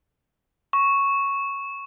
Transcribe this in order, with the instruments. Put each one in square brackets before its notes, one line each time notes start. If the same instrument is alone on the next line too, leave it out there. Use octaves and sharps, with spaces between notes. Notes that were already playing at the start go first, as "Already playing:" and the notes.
[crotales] C#6